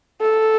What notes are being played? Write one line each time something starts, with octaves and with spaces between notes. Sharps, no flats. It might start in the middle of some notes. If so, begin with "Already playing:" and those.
A4